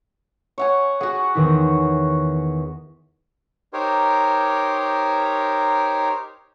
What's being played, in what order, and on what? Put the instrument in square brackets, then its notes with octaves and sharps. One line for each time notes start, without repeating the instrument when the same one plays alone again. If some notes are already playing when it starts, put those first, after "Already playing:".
[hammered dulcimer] C#5 F#5 G#5
[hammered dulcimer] F#4 F#5 [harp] G#4
[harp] E2 D#3 E4
[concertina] D#4 G4 A#4 C5 C#5